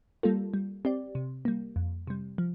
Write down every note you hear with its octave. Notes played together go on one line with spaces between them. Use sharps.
G3 A#3 F4 A4
G3
C4 G4 D5
C3
G3 A#3
F2
C3 G3
F3